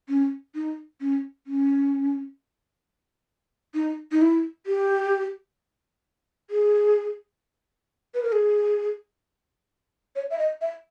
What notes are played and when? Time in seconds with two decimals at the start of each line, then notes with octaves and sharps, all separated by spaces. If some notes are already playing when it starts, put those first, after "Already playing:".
0.09 C#4
0.55 D#4
1.01 C#4
1.47 C#4
3.75 D#4
4.12 D#4
4.22 E4
4.66 G4
6.50 G#4
8.14 B4
8.23 A#4
8.32 G#4
10.16 C#5
10.30 E5
10.39 D#5
10.61 E5